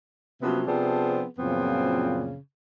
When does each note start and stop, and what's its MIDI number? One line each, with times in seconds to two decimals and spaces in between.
0.42 0.63 48
0.42 0.63 53
0.42 0.63 54
0.42 0.63 58
0.42 0.63 59
0.42 0.63 61
0.67 1.24 48
0.67 1.24 53
0.67 1.24 59
0.67 1.24 60
0.67 1.24 62
0.67 1.24 68
1.38 2.35 42
1.38 2.35 46
1.38 2.35 49
1.38 2.35 53
1.38 2.35 59
1.38 2.35 60